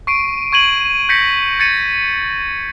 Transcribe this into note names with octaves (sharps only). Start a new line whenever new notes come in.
C#6 C7 D7 D#7
C#6 G#6 D#7 F#7
G6 G#6 A#6 B6 C#7
G#6 A6 C#7 D#7